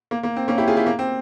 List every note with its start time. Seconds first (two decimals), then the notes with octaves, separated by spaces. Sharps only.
0.11 A#3
0.23 A#3
0.36 C4
0.48 A#3 C#4
0.58 E4 G4
0.67 F4 G#4
0.76 E4 G4
0.86 A#3
0.99 C4